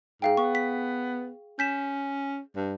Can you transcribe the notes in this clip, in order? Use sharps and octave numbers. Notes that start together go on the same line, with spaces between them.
G#2 G#4 F5 G5
B3 C#6
B6
C#4 G6 B6 E7
G2